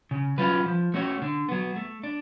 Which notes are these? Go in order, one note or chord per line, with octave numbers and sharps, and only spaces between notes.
C#3
F#3 C#4 F4 B4
F3
A3 C#4 F#4 C#5
D3
F#3 B3
A3
D4